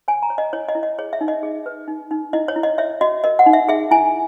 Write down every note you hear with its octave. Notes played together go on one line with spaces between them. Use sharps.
C#5 G#5
A#5
C#5
D#5
E4 C#5
D#5
E4
D#5
G#4 C#5
E5
D#4
D#5
G#4
B4
D#4
D#4
E4 D#5
C#5
E4
D#5
C#5 E5
F#4 D#5
A#4 D#5
F#5
D#4
E5
G#4 E5
E4 G#5